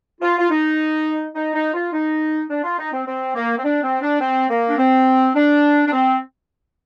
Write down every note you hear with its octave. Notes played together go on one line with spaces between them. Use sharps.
F4
F4
D#4
D#4
D#4
F4
D#4
D4
F4
D#4
C4
C4
A#3
C4
D4
C4
D4
C4
A#3
D4
C4
D4
D4
C4